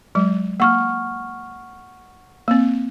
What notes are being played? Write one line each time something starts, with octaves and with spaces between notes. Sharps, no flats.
F#3 G#3
A#3 F#5 C#6 F6
A#3 C4